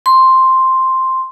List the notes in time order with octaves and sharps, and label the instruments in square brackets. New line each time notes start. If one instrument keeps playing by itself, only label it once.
[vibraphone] C6